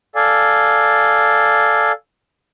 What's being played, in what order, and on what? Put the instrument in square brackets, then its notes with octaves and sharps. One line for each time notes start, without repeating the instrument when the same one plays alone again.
[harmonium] A4 D5 F5 G#5